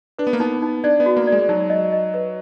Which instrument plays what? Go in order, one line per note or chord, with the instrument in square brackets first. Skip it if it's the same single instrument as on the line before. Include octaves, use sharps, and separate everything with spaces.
[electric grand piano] D4 [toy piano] B4
[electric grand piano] B3
A#3
[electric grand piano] B3 [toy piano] D#4
[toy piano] D#4
[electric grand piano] D4 [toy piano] D5
[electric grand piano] B3
[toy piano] F#4
[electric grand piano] A#3
[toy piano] D5
[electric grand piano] G#3
[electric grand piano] F#3 [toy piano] D#4
[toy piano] D#5
D#5
B4